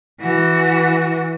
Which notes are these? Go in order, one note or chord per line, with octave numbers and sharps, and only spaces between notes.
E3 F#4